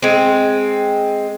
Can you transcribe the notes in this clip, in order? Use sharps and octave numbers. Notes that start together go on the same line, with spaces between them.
G#3 C4